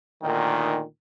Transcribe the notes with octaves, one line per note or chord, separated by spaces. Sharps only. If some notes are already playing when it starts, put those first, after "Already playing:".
D2 A#2 D#3